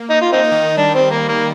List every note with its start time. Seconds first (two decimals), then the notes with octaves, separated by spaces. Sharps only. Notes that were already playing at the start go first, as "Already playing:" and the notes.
Already playing: A#3
0.10 D#4
0.21 F4
0.32 C4 D#4
0.44 A#3
0.52 D#3
0.69 D#3
0.77 G3 D4
0.94 C4
1.11 A#3
1.28 A#3